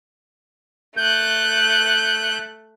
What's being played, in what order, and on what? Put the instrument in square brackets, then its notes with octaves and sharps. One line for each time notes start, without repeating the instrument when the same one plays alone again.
[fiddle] A3 F#6 [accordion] G6